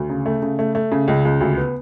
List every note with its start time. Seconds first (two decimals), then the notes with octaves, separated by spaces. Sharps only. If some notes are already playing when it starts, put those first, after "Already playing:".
Already playing: D2
0.10 C#3
0.26 A3
0.42 C#3
0.59 A3
0.75 A3
0.92 C#3
1.08 C#2
1.25 C#2
1.41 D2
1.57 B3